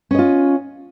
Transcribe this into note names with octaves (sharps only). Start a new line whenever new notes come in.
C#4 F4 D#5